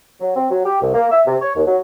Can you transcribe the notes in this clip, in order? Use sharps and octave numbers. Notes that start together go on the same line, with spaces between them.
F#3
C4
F#3
G4
C2
A#3
E5
C3
C#5
D#2
F#3